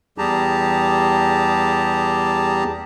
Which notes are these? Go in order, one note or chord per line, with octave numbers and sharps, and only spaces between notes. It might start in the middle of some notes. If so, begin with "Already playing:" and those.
E2 G3 G4 G#4 A5 A#5